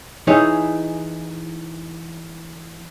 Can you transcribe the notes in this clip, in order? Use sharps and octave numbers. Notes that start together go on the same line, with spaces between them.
E3 D#4 E4 G#4 C#5